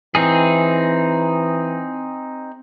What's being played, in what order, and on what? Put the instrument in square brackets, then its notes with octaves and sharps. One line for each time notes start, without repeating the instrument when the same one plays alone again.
[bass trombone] E3 [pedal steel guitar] C4 D#4 G#4